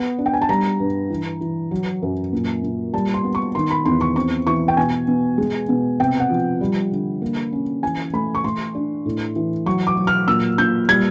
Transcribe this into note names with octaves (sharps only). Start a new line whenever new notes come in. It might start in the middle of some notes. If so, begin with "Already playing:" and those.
Already playing: B3
D4
G5
G#5
A5
G3 A#5
G2
E3
E3
F#3
F#2
A#2
A#2
G3 A5
C6
B3
C#6
D#3 C6
B5
E2 C6
C#6
C4 C#6
E3 C#6
G5
B2 G#5
B2
G#3
B2
C3 G5
F#5
F3
G3
D3
A#3
C#4
E3 G#5
A3 B5
C#6
A3 C6
D4
A2
E3
F#3 C#6
D6
F#3
F6
A#2 E6
A#2 G6
G3 G#6